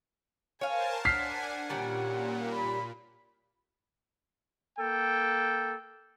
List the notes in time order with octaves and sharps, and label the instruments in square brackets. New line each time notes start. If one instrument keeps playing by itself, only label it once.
[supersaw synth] A#4 C5 A5 [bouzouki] C#5 F5 [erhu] G#5
[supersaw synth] D4 G#5 [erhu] F#5 [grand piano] F6 B6 C7
[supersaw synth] A#2 [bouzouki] D#3 G3 C#4
[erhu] B5
[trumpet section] A#3 A4 G5